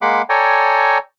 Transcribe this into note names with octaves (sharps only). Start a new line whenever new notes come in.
G#3 A#3 F#5 B5 C6 D6
A4 C#5 D5 G5 G#5 A#5